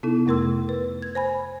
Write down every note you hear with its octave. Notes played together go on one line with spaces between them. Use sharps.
C3 B3 D#4 E4 A4
F2 C3 A3 A#4 C6 E6
B4
G#6
C5 G#5 B5